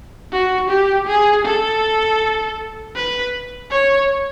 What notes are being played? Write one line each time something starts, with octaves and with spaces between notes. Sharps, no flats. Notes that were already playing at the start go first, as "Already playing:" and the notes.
F#4
G4
G#4
A4
B4
C#5